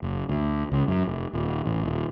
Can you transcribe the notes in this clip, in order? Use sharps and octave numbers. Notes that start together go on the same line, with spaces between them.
F#1
D2
C#2
F#2
F1
D#1
A1
D#1